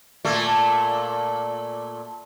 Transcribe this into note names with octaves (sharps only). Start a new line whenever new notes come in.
A#2 A3